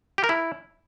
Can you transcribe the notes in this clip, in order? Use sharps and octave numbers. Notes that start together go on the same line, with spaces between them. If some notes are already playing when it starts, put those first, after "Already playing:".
G4
A#4
E4